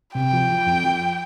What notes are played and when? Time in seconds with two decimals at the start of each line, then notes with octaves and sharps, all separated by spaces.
0.15 C3 G5
0.32 F3
0.50 F3
0.66 F2
0.84 F3